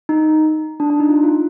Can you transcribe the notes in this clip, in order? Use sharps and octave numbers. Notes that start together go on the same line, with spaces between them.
D#4
D4
D4
D#4
F4
F4